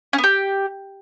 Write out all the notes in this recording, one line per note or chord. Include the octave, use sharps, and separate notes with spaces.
C#4
B3
G4